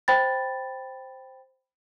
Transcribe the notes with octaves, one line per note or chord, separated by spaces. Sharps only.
C5 G5 B5 A6